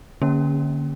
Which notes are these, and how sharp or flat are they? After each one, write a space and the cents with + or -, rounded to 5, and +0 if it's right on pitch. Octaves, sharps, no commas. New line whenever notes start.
D3 +0 A#3 +0 C#4 +5